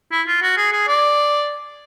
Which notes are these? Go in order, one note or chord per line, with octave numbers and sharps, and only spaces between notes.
E4
F4
F#4
G#4
G#4
D5